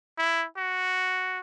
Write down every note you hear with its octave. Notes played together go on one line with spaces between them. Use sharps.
E4
F#4